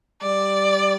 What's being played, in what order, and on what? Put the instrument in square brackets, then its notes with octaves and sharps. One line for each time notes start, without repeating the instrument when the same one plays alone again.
[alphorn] G3 [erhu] D5